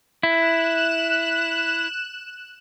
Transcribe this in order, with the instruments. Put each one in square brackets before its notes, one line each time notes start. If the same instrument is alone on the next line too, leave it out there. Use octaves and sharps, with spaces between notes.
[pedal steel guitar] E4 [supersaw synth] F#6 E7